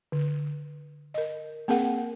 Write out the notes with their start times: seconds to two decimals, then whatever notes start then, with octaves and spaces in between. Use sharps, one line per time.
0.12 D3
1.14 A#4 D#5
1.68 A#3 C4 G#4 A#4 F#5